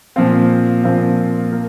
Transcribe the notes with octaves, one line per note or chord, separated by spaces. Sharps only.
A#2 F3 C4 F4
A#2 F3 C4 F4
A#3